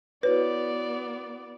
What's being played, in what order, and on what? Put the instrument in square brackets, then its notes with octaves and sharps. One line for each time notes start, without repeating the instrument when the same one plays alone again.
[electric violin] B3 D5 [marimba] E4 F#4 C#5 [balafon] B4